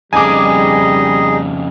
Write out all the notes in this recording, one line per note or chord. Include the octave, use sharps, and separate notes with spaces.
F2 C#3 G3 D#4 G#4 D#5 G#5 D6